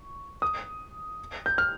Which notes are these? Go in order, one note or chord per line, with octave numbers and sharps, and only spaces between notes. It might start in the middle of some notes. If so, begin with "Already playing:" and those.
Already playing: C#6
D#6
G6
F6